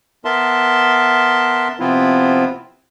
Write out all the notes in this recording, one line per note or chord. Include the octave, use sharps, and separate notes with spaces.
B3 A#4 E5 A5 C6
C3 F3 B3 C4 E4 F4